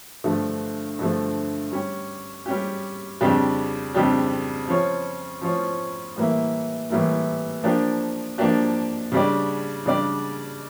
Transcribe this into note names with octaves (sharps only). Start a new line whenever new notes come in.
G2 D3 F3 A3
G2 D3 F3 A3
G3 C#4 G4
G3 C#4 G4
F2 C#3 G3 D4 G4
F2 C#3 G3 D4 G4
F3 C#4 F4 C#5
F3 C#4 F4 C#5
A2 E3 G3 A#3 E4
A2 E3 G3 A#3 E4
F3 A#3 D4 G4
F3 A#3 D4 G4
C#3 G3 D4 G4 D5
C#3 G3 D4 G4 D5